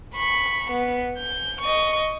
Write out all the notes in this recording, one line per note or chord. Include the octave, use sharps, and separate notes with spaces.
B5 C#6
B3
G6
D#5 C#6